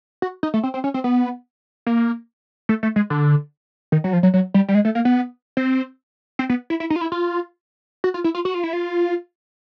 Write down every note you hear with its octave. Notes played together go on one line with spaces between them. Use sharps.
F#4
D#4
A3
C4
C4
C#4
C4
B3
A#3
A3
A3
G#3
D3
D#3
F#3
F3
F#3
F#3
G3
G3
G#3
A3
A#3
B3
C4
C4
B3
E4
E4
D#4
F4
E4
F4
F#4
F4
E4
F4
F#4
F4
E4
F4